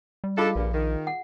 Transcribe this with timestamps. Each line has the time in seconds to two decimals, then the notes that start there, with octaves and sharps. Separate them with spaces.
0.24 G3
0.38 D4 D#4 F4 G#4 A4 F5
0.56 A#1 G2 A#2
0.74 D#3
1.07 F#5